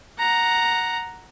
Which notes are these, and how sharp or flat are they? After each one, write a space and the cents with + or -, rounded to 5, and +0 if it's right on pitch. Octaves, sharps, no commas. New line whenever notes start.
F#5 +0 A#5 +0